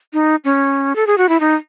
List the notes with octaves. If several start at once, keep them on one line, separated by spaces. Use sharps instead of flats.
D#4
C#4
A4
G#4
F#4
E4
D#4